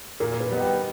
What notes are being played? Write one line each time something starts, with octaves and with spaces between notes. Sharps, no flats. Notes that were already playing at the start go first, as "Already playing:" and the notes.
A#2 A#4
B4
G3 B3 D#4
G5